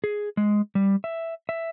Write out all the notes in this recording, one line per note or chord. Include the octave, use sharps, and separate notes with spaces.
G#4
G#3
G3
E5
E5